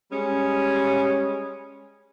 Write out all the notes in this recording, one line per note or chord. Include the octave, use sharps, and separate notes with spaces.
G3 G#3 C#4